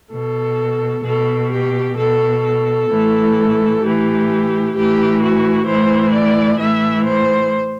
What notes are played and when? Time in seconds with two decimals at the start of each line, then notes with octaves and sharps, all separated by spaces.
0.11 B2 A4
1.03 B2 A4
1.50 G4
1.96 B2 A4
2.43 A4
2.89 A2 E3
3.81 A2 E3 G4
4.75 A2 E3 G4
5.21 F#4
5.66 A2 E3 C5
6.13 D5
6.59 A2 E3 E5
7.06 C5